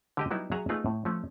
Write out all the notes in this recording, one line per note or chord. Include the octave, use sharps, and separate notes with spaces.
D3 G4 D#5
F#3 G3 B3 D#4 E4
F#3 G#4 E5 F#5 G#5 A#5
A3 B3 D#4 F4 G#4 B4
A2
F3 A3 C#4